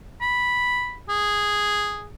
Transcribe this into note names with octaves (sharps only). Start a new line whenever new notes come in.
B5
G#4